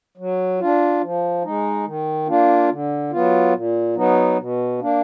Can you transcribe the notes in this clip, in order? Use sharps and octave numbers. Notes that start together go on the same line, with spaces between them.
F#3
D4 F4
F3
G#3 D#4
D#3
A#3 D4 F4
D3
F#3 B3 F4
A#2
F#3 B3 D#4
B2
A#3 D4